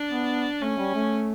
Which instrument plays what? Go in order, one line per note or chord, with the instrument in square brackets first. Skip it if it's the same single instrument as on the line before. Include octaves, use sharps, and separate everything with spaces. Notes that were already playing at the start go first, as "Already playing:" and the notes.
Already playing: [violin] D4
[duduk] B3
[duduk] A3 [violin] C#4
[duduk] G3
A3